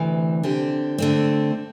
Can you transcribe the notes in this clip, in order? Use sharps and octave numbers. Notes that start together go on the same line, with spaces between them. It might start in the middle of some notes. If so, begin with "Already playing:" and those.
Already playing: D2 C3 E3
D3 C4 G4
D3 A3 C4